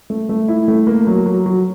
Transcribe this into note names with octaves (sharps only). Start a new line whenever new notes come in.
A3
A3
E4
A3
A#3
F#3
F#3
F#3